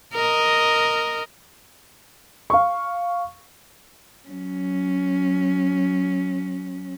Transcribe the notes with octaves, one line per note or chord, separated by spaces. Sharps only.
A#4 D#5
F5 C#6
F#3 C#4